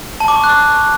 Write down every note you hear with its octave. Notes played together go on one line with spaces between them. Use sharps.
A5
D6
C#6
F#6